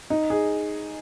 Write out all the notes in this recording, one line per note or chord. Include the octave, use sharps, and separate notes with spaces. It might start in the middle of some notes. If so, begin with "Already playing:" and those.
D#4
G#4